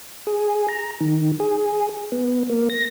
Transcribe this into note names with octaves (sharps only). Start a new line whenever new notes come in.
G#4
A#5
D#3
G#4
B3
A#3
A#6